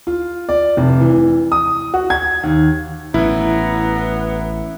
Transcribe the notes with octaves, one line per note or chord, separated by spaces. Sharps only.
F4
D5
F1
E3
D#6
F#4
G#6
D#2
A1 A2 B3 E4 A#5